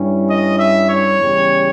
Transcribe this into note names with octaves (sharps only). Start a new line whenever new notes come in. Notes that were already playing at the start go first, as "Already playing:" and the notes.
Already playing: G2 G3 C#4 E4
D#5
E5
C#5
E2 C#3 G3 C#4